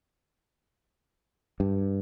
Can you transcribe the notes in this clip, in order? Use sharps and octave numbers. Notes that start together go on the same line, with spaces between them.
G2